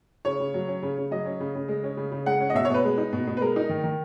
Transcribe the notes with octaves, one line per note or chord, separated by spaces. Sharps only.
C#3 C#5
C#3
F#3
C#4
C#3
C#3
F#3 D#5
C#4
C#3
C#3
G#3
C#4
C#3
C#3
G#3 F#5
C#4
D#5
B2 E5
C#5
B2 B4
G#3
D#4
B2
B2
B4
G#3 A#4
D#4
D#3
D#3